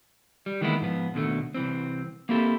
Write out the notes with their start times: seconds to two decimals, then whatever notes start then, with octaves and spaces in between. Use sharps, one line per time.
0.46 G3
0.61 D#3 E3 G#3 A#3 B3 E4
0.81 G#2 F3 B3
1.14 D#2 B2 D3 A3
1.54 C2 E3 C4
2.29 A#3 C4 E4 G4 A4